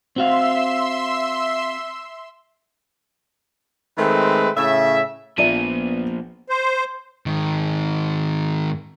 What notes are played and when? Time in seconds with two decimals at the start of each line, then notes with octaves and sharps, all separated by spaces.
0.16 C4 F#4 E5 F5 C6 E6
3.97 D#3 G#3 A3 C4 B4
4.56 A2 C#3 E5
5.38 A#1 A#2 F3 B3 D5 E5 D#7
6.50 C5
7.26 G#2 D#3